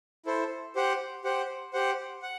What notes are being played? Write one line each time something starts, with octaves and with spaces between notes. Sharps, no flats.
E4 A4 C5
G4 C5 F#5
G4 C5 F#5
G4 C5 F#5
F#5